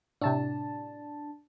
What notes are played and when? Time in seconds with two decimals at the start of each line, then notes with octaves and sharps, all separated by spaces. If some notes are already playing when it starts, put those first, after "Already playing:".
0.21 A2 C3 D4 A5